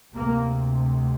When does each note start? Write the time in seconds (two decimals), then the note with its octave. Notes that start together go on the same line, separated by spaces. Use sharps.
0.15 D2 C3 A#3